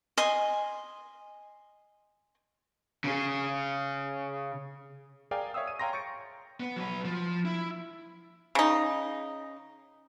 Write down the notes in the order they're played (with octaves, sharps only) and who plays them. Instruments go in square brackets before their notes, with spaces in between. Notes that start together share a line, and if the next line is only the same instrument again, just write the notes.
[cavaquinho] D#5 G#5 C6
[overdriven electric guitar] C#3 G#4
[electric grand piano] G#4 A#4 D5 F5 G5 G#5
C#5 E5 F5 D#6 E6
D#7
C#5 F5 G5 A#5 C6 A#6
C#6 G6 A6 C#7 D7
[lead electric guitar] B3
F#3 B4
F3
E4
[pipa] C#3 D#4